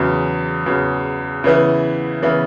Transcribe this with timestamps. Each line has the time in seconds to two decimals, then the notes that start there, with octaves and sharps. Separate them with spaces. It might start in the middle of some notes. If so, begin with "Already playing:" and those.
Already playing: E2 C#3 F#3
0.66 E2 C#3 F#3
1.44 C#3 E3 B3 E4
2.22 C#3 E3 B3 E4